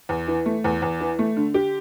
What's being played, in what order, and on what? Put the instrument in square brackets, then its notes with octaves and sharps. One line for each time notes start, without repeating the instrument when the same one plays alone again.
[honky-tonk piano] E2
E3
A3
E2
E2
E3
A3
D3
G4